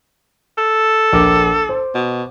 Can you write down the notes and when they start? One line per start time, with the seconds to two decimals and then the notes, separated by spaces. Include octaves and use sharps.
0.58 A4
1.13 A#1 A#4 D6
1.69 C5
1.95 B2